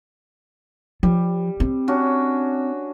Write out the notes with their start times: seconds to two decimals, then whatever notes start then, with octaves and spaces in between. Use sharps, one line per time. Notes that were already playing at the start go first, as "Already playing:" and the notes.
1.03 F3 G3
1.60 C4
1.88 C#4 D4 F#4